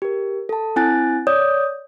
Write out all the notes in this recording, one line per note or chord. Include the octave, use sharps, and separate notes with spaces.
G4 A#4
A4 A5
C4 E4 G#5 F#6 A6
C#5 D5 D#6 G6